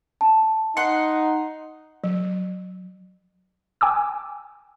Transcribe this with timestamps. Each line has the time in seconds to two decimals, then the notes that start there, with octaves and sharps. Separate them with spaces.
0.21 A5
0.77 D#4 F#5 C6 C#7
2.04 F#3
3.81 G5 G#5 D6 E6